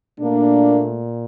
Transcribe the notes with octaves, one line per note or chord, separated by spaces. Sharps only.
A#2 A3 A#3 D4